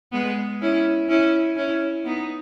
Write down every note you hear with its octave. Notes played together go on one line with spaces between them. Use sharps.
G#3 B3
C#4 E4
C#4 E4
C#4 E4
B3 D#4